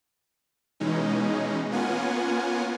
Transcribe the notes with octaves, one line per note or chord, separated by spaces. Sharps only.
B2 E3 G#3 C#4 D#4
A#3 B3 C#4 F4 F#5 G#5